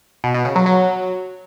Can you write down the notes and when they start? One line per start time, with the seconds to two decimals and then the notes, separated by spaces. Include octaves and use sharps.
0.24 B2
0.34 B2
0.45 C#3
0.56 F#3
0.66 F#3